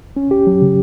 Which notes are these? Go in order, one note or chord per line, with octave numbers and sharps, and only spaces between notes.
C#4
G4
F#3
C#3